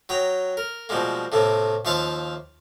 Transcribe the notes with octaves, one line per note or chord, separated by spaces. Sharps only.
F#3 G5 A#5 D#6
A#4
B2 F3 G3 G#3 A#3
A2 C3 A3 A#3
D#2 F3 E5 F5 A5 C6